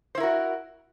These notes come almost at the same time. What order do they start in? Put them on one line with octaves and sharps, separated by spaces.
C5 E4 A#4 F#4